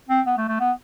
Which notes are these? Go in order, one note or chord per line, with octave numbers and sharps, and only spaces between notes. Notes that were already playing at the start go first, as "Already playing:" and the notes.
C4
B3
A3
A3
B3